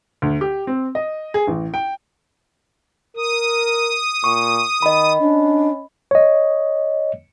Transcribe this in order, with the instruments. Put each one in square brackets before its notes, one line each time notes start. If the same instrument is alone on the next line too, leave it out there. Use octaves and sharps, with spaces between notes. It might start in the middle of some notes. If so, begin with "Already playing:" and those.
[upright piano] D2
G4
C4
D#5
G#4
A1
G5
[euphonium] A#4 [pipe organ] D#6
[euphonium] A#2 [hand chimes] C#6
[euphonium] D#3 [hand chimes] D#5 B5
[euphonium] C#4 [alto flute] D4
[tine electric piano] C#5 D#5